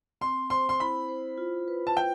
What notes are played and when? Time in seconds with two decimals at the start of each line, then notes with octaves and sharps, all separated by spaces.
0.21 C4 C6
0.50 C5 C6
0.69 C6
0.80 E4 B5
1.08 C5
1.38 F4
1.68 B4
1.87 A5
1.97 B4 G5